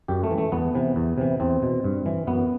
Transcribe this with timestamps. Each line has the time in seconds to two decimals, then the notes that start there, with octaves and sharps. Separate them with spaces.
0.08 F#2 G4
0.24 A3
0.31 E3
0.38 A3
0.52 E2 B3
0.75 C3 E3
0.96 E2
1.18 C3 E3
1.40 E2 C4
1.62 B2
1.84 G2
2.06 E3
2.27 F#2 B3